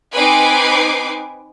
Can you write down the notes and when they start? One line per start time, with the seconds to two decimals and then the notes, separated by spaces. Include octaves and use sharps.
0.14 C4 D#4 B4 G#5 D6 C7